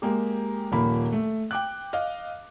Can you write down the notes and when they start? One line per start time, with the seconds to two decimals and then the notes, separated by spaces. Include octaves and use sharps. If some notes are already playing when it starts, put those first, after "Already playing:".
0.02 G#3 A#3 G4
0.72 D#1 F3 A#3 B5
1.12 A3
1.51 G5 D6 F#6
1.93 D#5 F5